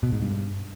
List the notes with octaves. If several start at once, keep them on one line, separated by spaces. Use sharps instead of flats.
B2
G#2
G2